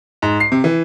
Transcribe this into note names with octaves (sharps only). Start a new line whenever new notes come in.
G#2
C7
C3
E3